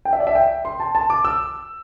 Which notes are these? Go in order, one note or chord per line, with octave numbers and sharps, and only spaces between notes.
G5
E5
D5
E5
G5
C6
A5
A5
D6
E6